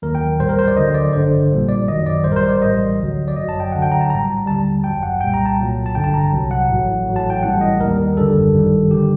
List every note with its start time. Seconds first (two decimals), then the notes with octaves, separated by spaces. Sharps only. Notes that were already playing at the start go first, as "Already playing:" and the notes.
0.02 D#2 D#3 F#3 A#4
0.15 G5
0.40 A#1 A2 G3 C5
0.49 A#4
0.59 C5
0.68 D5
0.76 D2 D3 F#3 D#5
0.94 D5
1.13 A1 G2 D3 C5
1.51 A#1 A#2 G3
1.69 D5
1.87 F#2 D#3 F#3 D#5
2.06 D5
2.24 A1 A2 G3 C5
2.32 A#4
2.36 C5
2.49 D5
2.61 A1 A2 G3 D#5
2.99 D2 D3 F#3
3.28 D5
3.36 G1 F#2 F#3 D#5
3.49 A5
3.60 G5
3.72 D2 D3 F#3 F#5
3.82 G5
3.92 A#5
4.01 A5
4.10 A#1 A2 G3 A#5
4.46 D#2 D3 G3 A5
4.84 G1 F#2 F#3 G5
5.03 F#5
5.21 C2 A#2 G3 G5
5.34 A#5
5.46 A5
5.58 C2 A#2 F#3
5.86 A5
5.95 A1 G2 D3 G5
6.04 A5
6.14 A#5
6.32 C2 C3 F#3
6.51 F#5
6.69 A1 A2 F#3
7.06 A1 A2 F#3
7.16 A5
7.30 G5
7.43 A1 A2 G3 F#5
7.61 D#5
7.80 D#2 D#3 G3 A#4
8.17 G1 F#2 D3 G3 A4
8.54 A1 G2 D#3 G3
8.91 D3 G3 G4